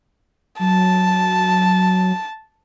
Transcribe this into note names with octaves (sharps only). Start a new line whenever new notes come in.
F#3 A5